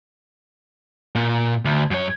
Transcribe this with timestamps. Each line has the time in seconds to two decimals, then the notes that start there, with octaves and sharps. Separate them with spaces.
1.15 A#2
1.65 D2
1.91 F#2 C#5